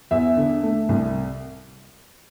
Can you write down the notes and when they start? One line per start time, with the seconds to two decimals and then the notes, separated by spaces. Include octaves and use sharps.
0.11 E2 E5
0.37 D3
0.63 A3
0.89 C2